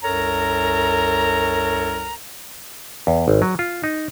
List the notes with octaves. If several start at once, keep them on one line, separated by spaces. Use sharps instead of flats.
C2 F#2 A4 A#4 C#5 A#5
E2
G#1
F#3
F4
D#4